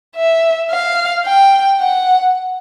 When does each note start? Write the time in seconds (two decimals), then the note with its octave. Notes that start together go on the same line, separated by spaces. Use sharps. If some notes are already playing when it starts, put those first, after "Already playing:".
0.16 E5
0.71 F5
1.25 G5
1.80 F#5